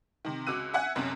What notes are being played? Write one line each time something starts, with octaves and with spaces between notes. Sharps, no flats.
C3 D#3
C#2 F#4 D6 E6 F#6 D#7
E5 F#5 G#5 F#6
B1 F#2 C3 C#4